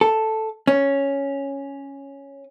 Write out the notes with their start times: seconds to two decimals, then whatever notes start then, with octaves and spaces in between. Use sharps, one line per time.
0.01 A4
0.67 C#4